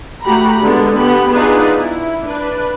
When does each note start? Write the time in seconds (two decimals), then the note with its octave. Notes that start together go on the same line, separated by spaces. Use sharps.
0.24 A3 F#4 G4 A#5 B5
0.62 D3 G#3 B3
0.98 B3 G4 B5
1.33 B3 D4 D#4 F4 G#4 B4
1.79 E4
2.25 D4 B4